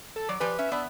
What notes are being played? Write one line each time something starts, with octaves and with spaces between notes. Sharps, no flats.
A4
F#3 D5
F3 G4 B4 G#5
C#4 E5
B3 D4